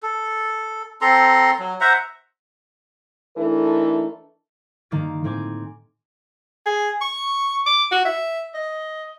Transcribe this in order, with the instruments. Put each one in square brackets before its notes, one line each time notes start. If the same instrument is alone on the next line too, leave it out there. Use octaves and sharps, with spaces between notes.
[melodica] A4
C4 A4 A#5 C6
F#3
C5 E5 F#5 A#5
[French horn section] E3 A3 D4 D#4 A4 A#4
[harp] G2 D#3 A#3 A#5 D6 A6
A2 D#3 C4 G#5 D6
[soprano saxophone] G#4
C#6
D6
F#4
E5
D#5